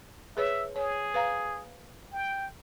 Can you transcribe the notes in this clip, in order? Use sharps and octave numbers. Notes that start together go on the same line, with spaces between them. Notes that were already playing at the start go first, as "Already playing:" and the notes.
G#4 B4 C#5 E5
G#4 C#5
B4 F5 A#5
G5